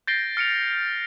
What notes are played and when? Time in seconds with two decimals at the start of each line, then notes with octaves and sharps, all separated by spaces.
0.07 G6 A6 A#6 C7 D7 G7
0.37 F6 C#7 D7 F7